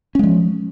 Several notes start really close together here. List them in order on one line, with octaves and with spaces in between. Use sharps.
C#4 G#3 F3